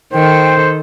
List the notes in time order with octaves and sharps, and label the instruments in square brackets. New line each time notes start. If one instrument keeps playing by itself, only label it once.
[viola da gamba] D#3 A4 [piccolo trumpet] C5 [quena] G5